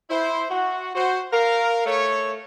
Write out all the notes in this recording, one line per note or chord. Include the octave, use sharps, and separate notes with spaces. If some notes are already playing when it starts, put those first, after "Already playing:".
E4 C5
F#4
F#4 C5
A#4 F5
A3 C#5